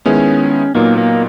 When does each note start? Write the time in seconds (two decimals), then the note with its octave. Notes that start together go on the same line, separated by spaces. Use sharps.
0.06 D#3 G#3 B3 C#4 E4 G#4
0.75 A#2 F#3 A#3 B3 D#4
0.98 A#3